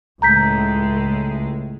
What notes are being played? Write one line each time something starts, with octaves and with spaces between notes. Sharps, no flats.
C#2 A2 G#3 A#5 G6 B6